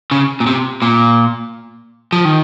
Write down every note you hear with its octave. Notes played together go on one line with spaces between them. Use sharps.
C#3
A#2
C3
A#2
F3
D#3